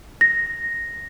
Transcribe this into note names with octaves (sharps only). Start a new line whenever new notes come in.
A#6